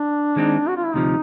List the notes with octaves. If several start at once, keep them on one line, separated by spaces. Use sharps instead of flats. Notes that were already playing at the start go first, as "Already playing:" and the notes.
Already playing: D4
D#3 G#3 C4 D#4
F#4
F4
E4
D2 C3 F3 D#4